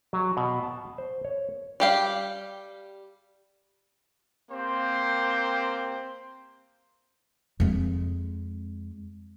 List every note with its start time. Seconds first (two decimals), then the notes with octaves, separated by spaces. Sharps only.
0.13 F#3
0.37 B2
0.63 A5
0.98 C5
1.25 C#5
1.80 G3 G4 F5
4.51 A#3 C4 G4 C5
7.60 F2 G#3